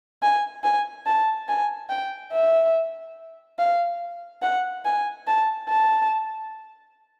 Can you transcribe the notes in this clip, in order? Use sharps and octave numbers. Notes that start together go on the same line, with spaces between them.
G#5
G#5
A5
G#5
G5
E5
F5
F#5
G#5
A5
A5